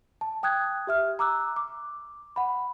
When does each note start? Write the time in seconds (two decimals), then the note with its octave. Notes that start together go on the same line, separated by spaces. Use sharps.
0.21 A5
0.43 G5 D#6 F#6 G#6
0.87 G4 E5 F6
1.19 A#5 D6 E6 F#6
1.56 D6
2.36 F#5 B5